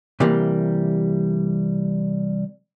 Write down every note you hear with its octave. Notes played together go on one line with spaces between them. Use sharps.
C3 E3 G3 A#3